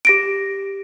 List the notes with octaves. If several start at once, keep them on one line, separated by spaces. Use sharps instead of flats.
G4 A#6 D7